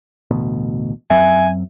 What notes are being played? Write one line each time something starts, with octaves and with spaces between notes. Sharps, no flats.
A1 D2 B2
F#2 F#3 C4 E5 G#5